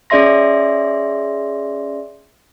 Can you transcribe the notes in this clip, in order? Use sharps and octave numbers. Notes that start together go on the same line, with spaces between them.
C#4 G#4 D5 E5 C6 A#6